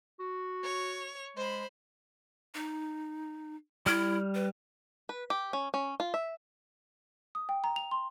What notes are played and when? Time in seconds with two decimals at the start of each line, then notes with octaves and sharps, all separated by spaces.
0.20 F#4
0.63 C#5 F7
1.37 G#3 C5 B5
2.55 D#4
3.86 G3 E4 F6
4.35 B4
5.09 B4
5.30 G4
5.53 C#4
5.74 C#4
6.00 F4
6.14 E5
7.35 D#6
7.49 G5
7.64 A#5
7.76 F7
7.91 C6